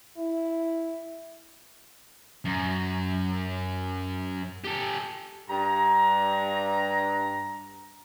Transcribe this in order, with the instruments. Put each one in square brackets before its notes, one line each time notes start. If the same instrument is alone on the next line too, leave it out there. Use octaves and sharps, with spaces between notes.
[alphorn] E4
[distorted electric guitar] F#2
G4 A4
[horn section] G2 A#5